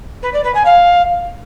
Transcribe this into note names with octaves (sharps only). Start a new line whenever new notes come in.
B4
D5
B4
G#5
F5